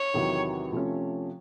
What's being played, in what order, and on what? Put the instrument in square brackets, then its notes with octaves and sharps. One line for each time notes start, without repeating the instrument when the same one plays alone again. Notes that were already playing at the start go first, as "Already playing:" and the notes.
Already playing: [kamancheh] C#5
[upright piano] E2 C3 D#3 F#3
C3 F3 A3 C#4